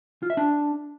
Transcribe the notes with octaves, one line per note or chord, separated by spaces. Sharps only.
F4
E5
D4